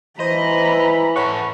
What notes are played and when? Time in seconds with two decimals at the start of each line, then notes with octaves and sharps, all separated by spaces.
0.20 E3 C5 D#5 A#5 B5
1.16 A4 B4 C#5 F#5 C#6